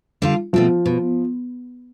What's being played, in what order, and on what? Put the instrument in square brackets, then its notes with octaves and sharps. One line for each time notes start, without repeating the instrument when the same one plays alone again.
[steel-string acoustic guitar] D3 G3 D4 F4
[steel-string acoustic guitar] B2 A3 C4 [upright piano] F3
[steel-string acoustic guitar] B2